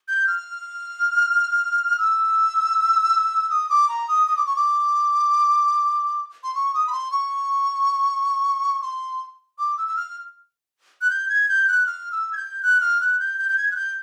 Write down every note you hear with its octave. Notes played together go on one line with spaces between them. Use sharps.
G6
F6
E6
D#6
D6
A#5
D#6
D#6
D6
C#6
D6
C6
C#6
D#6
B5
C6
C#6
C6
D6
E6
E6
F6
F#6
G6
G#6
G6
F#6
F6
E6
G#6
G6
F#6
F6
F#6
G6
G6
G6
G#6
F#6
G6